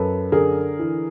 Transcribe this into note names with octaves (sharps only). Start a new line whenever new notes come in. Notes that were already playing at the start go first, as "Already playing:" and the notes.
Already playing: F#2 A4 B4
D3 G#4 A#4
E3